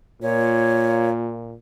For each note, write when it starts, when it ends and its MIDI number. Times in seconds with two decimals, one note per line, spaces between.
0.22 1.55 46
0.22 1.47 58
0.22 1.47 65
0.22 1.09 73